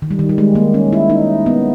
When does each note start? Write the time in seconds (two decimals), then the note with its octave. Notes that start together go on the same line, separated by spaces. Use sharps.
0.02 D#3
0.11 G3
0.19 D#3
0.29 G3
0.38 G#3
0.55 A#3
0.74 C#4
0.93 E4
1.10 D#4
1.46 B3